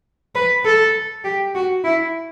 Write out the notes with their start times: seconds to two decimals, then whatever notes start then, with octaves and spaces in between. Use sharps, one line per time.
0.35 B4
0.65 A4
1.24 G4
1.55 F#4
1.84 E4